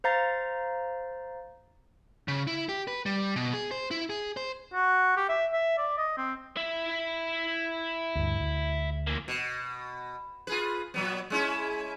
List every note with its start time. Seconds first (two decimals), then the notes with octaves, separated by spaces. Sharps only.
0.04 C5 F5 A#5 A6
2.28 C#3
2.47 E4
2.69 G4
2.88 B4
3.06 G3
3.36 B2
3.54 G#4
3.71 C5
3.91 E4
4.10 G#4
4.37 C5
4.74 F#4
5.17 G4
5.29 E5
5.52 E5
5.78 D5
5.98 D#5
6.18 C4
6.57 E4 E5
8.15 D2 G2
8.40 D2
9.07 E3 A#3
9.28 B2
10.47 F4 G#4 B4
10.94 A#2 F#3 B3
11.30 G#3 C#4 E4